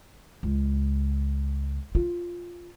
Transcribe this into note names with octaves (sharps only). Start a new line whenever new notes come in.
C#2
F4